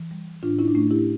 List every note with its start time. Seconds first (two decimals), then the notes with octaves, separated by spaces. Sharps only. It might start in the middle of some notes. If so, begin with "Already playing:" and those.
Already playing: E3
0.11 G3
0.43 A2 D4 F4
0.59 C#4 E4
0.68 D4
0.75 A2 A3 C#4
0.91 E4 G4